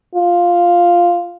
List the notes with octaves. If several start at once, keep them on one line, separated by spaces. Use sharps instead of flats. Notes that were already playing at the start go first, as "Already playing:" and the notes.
F4